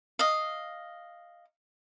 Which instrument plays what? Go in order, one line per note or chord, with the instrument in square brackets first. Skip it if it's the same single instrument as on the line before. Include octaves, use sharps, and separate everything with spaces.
[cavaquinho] D#5 F5